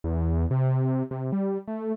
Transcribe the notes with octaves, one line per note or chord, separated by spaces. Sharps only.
E2
C3
C3
G3
A3